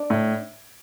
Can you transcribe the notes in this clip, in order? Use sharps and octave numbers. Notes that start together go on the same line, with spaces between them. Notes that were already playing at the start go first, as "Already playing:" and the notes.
Already playing: D4
A2